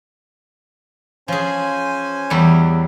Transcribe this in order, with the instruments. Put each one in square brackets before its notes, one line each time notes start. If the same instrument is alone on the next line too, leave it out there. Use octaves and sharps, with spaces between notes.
[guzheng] F3 G#4 [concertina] C#4 C5 G#5
[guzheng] E2 G3 C#5